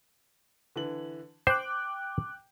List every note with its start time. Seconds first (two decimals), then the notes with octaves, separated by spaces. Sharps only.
0.76 D3 E3 F#7
1.47 C5 G5 D6 F#6